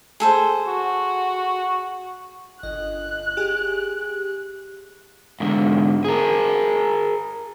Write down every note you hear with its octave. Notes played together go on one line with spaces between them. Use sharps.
G#4 A4 C5
F#4
G1 D#5 F#6
G4 G#4 G#5
G#2 D3
G#4 A#4